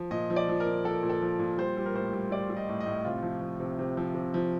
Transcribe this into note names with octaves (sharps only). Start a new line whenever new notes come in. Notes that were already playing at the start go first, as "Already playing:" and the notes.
Already playing: F3
A#2 D#5
F3
D5
F3
A#4
A#2
F3 A4
A#2
A4
F3
A#2
G3 C5
G3
A#4
A2 C5
G3
G3 D5
G3
D#5
A2
D#5
A2
C3 F4
F3
F3
C3
C3
F3
C3
F3